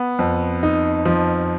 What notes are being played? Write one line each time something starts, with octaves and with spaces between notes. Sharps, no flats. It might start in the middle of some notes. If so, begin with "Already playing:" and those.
Already playing: B3
F2
D#4
F3